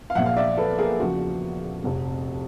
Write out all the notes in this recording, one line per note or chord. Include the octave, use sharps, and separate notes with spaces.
F5
A#1 A#2 F3 E5 F#5
F5
D5 E5
A4 B4
G#4 A#4
E2 C#3 F3 F#4
F1 F2 C3